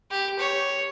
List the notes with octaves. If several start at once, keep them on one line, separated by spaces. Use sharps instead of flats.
G4
C#5